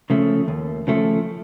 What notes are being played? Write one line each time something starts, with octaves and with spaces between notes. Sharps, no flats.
C#3 F3 A3
D#2
C#3 F3 A3